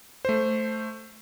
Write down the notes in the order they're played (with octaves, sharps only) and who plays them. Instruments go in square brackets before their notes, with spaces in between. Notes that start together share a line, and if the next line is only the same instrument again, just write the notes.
[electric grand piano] A3 C5